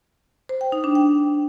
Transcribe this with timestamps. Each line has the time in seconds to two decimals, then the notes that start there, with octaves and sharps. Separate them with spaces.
0.49 C5
0.61 G5
0.72 D#4
0.84 D4
0.95 G5